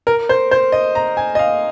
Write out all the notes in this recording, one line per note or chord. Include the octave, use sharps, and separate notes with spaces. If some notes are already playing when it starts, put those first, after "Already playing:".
A#4
C5
C5
D#5
A#5
G#5
D#5
F5